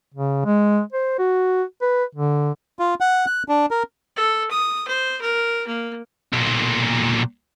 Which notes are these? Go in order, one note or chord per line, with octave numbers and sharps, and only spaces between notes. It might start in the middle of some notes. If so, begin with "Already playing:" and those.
C#3
G#3
C5
F#4
B4
D3
F4
F#5
F#6
D4
A#4
A4
D#6
C5
A#4
A#3
B1 A#2